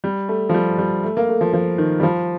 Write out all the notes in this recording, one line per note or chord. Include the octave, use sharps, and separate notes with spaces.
G3
A3
F3
G3
G3
A3
A#3
A3
F3
F3
D#3
G3
F3